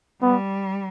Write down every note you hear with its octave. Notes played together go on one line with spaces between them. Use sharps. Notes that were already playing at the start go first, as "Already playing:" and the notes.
G3 B3